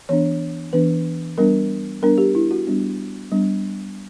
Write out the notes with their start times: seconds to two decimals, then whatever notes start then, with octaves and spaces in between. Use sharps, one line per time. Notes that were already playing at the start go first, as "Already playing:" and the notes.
0.09 E3 B3 D4 C#5
0.73 E3 B3 D4 B4
1.38 G3 B3 D4 A#4
2.02 G3 B3 D4 A#4
2.18 G4
2.35 E4
2.51 F#4
2.67 G3 B3 D4
3.32 G3 B3 D4